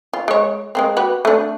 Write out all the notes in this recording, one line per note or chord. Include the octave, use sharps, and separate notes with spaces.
F4
G#3 C#5
G#3 A#3 C4
F#4 G4 B4
A3 D4